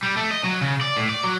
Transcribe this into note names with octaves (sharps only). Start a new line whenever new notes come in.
G3
A3
D#5
F#3
C#3
D5
A2
D5
F#3